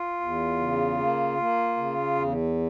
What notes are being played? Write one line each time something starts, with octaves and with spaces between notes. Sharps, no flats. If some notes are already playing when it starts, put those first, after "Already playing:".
Already playing: F4
E2
C#3
A#3
A#3
C#3
E2